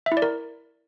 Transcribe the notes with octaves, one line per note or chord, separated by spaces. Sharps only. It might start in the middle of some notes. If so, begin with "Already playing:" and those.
E5
E4
D5
A#4